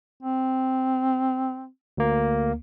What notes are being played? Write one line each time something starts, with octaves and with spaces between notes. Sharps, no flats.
C4
D2 A#3